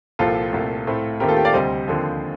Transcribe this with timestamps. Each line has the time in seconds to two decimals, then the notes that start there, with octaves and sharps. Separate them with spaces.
0.19 C2 A#2 F3 C4 F4 A4
0.53 C2 A#2 A3 C4
0.87 A2 A3 C4
1.20 D#2 D#3 A3 C4 G4 A#4
1.28 F4 A4
1.37 G4
1.45 D5 F5
1.54 D2 C3 G3 C5 D#5
1.88 D#2 D3 F3 C4